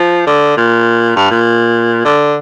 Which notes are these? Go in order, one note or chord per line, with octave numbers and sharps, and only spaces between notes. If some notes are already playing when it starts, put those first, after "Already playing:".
Already playing: F3
D3
A#2
G2
A#2
D3